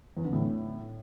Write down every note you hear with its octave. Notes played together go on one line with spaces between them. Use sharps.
E2
D3
A2